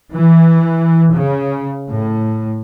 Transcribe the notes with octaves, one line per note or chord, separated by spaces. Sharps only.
E3
C#3
A2